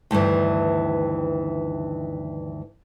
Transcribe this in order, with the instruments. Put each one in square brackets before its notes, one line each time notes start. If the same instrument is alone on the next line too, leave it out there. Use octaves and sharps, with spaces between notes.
[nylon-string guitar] D2 G2 D#3 E3